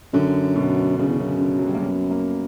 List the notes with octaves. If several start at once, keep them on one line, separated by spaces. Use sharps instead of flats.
F#2 D3
B2
F#2 C#3
E2
F#2
D3
F#3
G3
A#3
B3
A#3